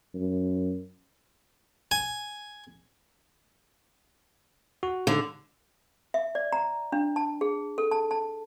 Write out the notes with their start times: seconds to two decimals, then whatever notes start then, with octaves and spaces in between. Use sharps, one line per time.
0.15 F#2
1.91 G#5
4.83 F#4
5.07 D3
6.14 E5
6.35 D5
6.53 A#5
6.92 D4
7.16 A5
7.41 G#4
7.78 A4
7.91 A5
8.11 A5